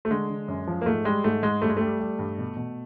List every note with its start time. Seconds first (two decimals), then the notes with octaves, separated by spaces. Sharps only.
0.05 A3
0.10 D3 G#3
0.29 D3
0.48 F#2
0.67 F3
0.81 A#3
0.86 G#2 A3
1.05 G3 G#3
1.24 G#2 A3
1.43 G#2 G#3
1.62 G2 A3
1.69 G#3
1.77 G3 A3
2.00 G3
2.19 G2
2.38 B2
2.57 B2